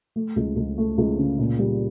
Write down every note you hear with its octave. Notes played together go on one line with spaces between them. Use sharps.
A3
C#2
C#2
A3
C#2
C#3
A#2
G3